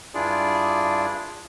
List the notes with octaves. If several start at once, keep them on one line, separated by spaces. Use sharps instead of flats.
G2 D4 E4 F4 G#4 D5